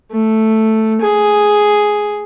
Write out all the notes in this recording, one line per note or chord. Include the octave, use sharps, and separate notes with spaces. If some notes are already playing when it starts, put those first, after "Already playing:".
A3
G#4